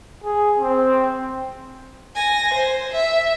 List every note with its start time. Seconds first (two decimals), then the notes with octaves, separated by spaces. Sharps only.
0.24 G#4
0.59 C4
2.16 G#5 A#6
2.54 C5
2.93 E5